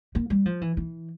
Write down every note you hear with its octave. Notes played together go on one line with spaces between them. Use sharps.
A#3
G3
F3
E3
E3